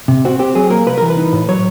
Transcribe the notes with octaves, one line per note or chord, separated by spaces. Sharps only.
C3
C4 F#4
C4 G4
F#3 G#4
A#3 A#4
C2 B4
E3 A#4
B4
D#4
A2
F#3 C#5